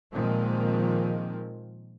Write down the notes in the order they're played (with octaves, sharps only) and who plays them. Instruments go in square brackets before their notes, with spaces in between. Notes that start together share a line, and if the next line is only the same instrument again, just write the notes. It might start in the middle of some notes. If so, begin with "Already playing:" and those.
[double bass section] A#2 D#3 F3 G#3 A#3 C4